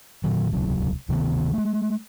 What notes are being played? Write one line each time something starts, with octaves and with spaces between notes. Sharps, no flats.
A#2 D#3 F#3
D#1 C#2 C3 F#3
D2 C3 D#3 B3
G#3 A3